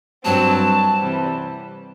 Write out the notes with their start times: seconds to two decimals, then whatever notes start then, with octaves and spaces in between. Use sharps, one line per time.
0.25 G2 F#3 C4 A5
0.99 C3 E3 G3 C4